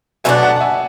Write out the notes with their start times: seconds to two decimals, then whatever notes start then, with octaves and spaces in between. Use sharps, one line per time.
0.24 B2 F#3 A3 D4 E5 G#5
0.43 F#5 A5
0.56 F#5
0.60 E5 G#5